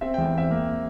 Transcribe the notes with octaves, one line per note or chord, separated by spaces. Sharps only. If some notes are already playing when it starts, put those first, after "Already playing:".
C4 E5
G5
E2
G5
C4 E5
A#3